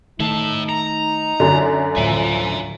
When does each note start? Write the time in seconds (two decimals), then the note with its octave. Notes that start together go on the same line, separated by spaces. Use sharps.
0.20 D#3 A3 D#4 E4 A5
0.69 A#5
1.40 F#2 D3
1.97 D2 A2 F3 F#3 E5 G#5